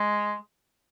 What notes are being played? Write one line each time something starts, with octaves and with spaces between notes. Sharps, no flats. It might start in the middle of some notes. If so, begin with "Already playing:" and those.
Already playing: G#3